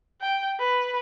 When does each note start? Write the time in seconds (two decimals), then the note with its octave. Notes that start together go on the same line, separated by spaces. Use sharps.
0.21 G5
0.59 B4